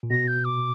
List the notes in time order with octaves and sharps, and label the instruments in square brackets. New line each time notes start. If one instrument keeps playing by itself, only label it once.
[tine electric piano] A#2
[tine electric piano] B2 [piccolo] A#6
[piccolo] G6
D6